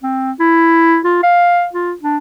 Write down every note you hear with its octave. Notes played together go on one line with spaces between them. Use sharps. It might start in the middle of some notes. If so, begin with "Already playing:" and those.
C4
E4
F4
F5
F4
D4